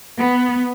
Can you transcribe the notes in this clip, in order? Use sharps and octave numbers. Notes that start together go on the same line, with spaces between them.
B3